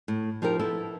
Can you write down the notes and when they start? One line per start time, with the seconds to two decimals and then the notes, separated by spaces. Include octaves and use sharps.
0.08 A2
0.42 F3 D#4 G4 A#4
0.59 B3 E4 A4